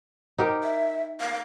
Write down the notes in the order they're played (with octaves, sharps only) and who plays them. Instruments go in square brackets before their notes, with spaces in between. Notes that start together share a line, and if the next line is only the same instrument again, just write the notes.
[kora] D#4 G4 A#4
[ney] E5
F5